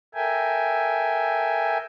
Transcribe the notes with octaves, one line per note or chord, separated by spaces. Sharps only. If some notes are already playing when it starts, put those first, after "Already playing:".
A4 A#4 E5 G5 G#5